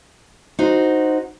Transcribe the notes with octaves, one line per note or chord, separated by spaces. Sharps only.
D#4 F#4 C5